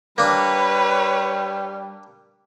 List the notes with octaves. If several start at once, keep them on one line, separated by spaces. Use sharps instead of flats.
G3 A#3 D4 B4 C#5